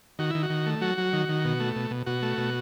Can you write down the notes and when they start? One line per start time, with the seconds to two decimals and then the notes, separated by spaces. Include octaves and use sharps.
0.19 D#3 F#4
0.30 D#3 E4
0.43 F#4
0.50 D#3
0.66 A3
0.81 F#3 F#4
0.98 F#3
1.13 D#3
1.29 D#3
1.45 B2
1.60 A3
1.76 B2
1.91 B2
2.06 B2 F#4
2.22 A3
2.38 B2